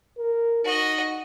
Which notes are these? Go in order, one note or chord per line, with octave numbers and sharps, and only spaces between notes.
A#4
D#4 F#4 D#5